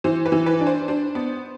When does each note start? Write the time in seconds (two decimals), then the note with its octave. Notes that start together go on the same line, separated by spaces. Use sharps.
0.04 E3 C5
0.26 B4
0.32 E3
0.46 B4
0.60 D4
0.67 C5
0.88 D4 C5
1.15 B3